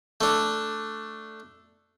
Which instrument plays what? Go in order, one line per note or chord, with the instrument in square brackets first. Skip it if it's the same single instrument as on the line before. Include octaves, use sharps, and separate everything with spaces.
[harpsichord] A3 D4